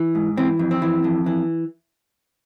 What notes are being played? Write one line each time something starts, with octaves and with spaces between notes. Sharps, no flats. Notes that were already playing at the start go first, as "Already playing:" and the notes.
Already playing: E3
G#2
E3 C4
F2
C4
E3
F2
E3